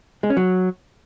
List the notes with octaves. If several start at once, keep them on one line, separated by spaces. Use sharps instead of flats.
G#3
C#4
F#3